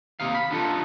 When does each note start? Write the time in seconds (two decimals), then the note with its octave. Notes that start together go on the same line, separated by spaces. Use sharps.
0.20 D#2 C3 D#4 F5
0.35 B5
0.51 B3 D4 D#4 F4 A4